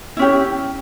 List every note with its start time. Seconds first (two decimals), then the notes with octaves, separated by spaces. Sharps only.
0.17 E4
0.19 C#4
0.22 G4